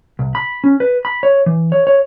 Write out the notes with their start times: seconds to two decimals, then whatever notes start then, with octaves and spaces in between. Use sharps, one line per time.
0.19 C2
0.35 B5
0.64 C#4
0.80 B4
1.05 B5
1.23 C#5
1.46 E3
1.72 C#5
1.87 C#5